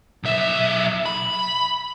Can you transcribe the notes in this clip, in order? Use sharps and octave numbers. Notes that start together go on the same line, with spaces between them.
B1 E5
B5